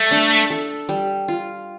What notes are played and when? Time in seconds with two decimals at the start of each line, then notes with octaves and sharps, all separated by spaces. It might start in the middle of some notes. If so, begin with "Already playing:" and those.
Already playing: G3 A3
0.11 D4
0.50 A4
0.89 G3
1.28 F4